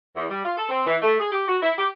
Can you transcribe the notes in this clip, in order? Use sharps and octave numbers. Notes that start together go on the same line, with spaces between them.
E2
G3
F4
A4
C4
E3
A3
G#4
G4
F#4
E4
G4